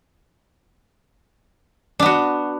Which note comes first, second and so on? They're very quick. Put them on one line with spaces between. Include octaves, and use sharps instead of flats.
D4 B3 F#4